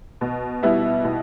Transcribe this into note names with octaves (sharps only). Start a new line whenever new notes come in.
B2
G3 B3 E4
B2